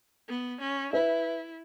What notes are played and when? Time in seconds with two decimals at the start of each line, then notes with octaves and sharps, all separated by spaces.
0.28 B3
0.60 C#4
0.93 E4 B4 E5